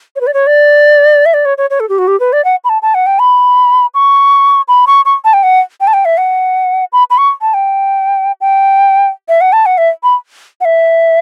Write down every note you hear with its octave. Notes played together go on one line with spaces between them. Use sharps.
C#5
B4
D5
C#5
D5
E5
D5
C#5
C#5
C#5
A4
G4
F#4
G4
B4
D5
F#5
B5
A5
A5
F#5
G5
B5
C#6
B5
C#6
C#6
A5
G5
F#5
G5
A5
G5
E5
F#5
B5
B5
C#6
A5
G5
G5
E5
F#5
A5
F#5
E5
B5
F#5
E5